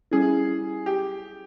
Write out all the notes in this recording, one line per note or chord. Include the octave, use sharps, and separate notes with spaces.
G3 C#4 E4 G#4
G4